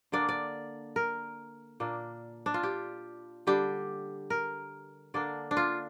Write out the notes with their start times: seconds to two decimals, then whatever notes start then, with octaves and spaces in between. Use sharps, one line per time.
0.12 D3 A#3 D4 D5
0.29 D5
0.96 A#4
1.80 A#2 A#3 D4
2.46 D4
2.54 F4
2.63 G4
3.47 D3 G3 D4 G4
4.30 A#4
5.14 D3 A#3 D4 D5
5.51 D4
5.57 F4